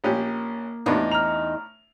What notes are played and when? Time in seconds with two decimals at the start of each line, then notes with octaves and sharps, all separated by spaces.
0.04 A#1 A#3 C#4 G4
0.86 E2 A2 B3 D4 D#4
1.12 A#5 F6 F7